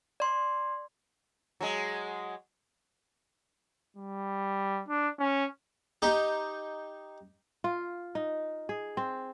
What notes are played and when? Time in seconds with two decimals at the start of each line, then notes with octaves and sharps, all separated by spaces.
0.20 D5 C6
1.60 F#3 G#3
3.97 G3
4.88 D4
5.19 C#4
6.02 D#4 G4
7.64 F4
8.15 D#4
8.69 G#4
8.97 C4